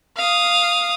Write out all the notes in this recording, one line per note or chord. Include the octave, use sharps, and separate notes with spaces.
F5 D#6